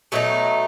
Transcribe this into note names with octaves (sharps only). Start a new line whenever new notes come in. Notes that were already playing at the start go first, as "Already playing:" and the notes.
B2 F#3 A3 D#4